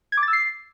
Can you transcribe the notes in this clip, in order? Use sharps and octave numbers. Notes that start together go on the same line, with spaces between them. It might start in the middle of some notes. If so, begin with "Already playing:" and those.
G#6
D6
A6
E6
C7